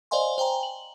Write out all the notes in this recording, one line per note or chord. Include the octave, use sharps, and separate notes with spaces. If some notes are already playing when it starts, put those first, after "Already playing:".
C5 D5 D#5 F5 G#5 C6
C5 G5 G#5 A#5
F#7